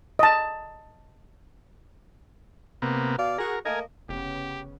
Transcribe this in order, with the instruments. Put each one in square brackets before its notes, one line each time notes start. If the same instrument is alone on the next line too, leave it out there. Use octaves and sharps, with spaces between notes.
[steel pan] D#5 A5
[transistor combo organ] C3 A#3 B3
[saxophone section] B2 D5 F5
[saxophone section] F#4 G#4 [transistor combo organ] A#4
[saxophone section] A3 A#3 D#5 [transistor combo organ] A#4 G#5
[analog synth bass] F1 [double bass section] C#3 B3 C#4 [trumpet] G4